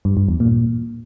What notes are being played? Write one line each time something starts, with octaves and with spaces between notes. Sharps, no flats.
G2
G2
E2
A#2